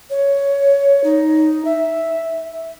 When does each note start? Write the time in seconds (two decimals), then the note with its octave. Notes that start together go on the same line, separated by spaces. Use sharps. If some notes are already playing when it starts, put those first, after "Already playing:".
0.10 C#5
1.04 D#4
1.65 E5